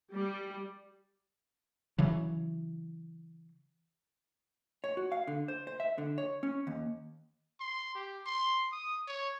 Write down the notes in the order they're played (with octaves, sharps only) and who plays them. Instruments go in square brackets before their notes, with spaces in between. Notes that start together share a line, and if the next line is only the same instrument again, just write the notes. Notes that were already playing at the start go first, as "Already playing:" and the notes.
[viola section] G3
[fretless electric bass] C#3 E3 F#3
[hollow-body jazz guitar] C#5
F#4
F5
D3
C5
C5
E5
D3
C#5
C#4
D#2
[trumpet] C6
G4
C6
D#6
C#5